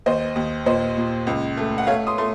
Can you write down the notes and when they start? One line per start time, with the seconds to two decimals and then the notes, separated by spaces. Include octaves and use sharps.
0.06 D#2 C5 D#5
0.36 D#2
0.66 A#2 C5 D#5
0.97 A#2
1.27 C#2
1.57 A3
1.78 F#5
1.87 A3 C#5 F5
2.07 C6 D#6
2.18 A3 C6